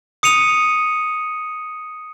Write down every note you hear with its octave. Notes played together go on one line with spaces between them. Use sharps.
D#6 C#7 D#7 F7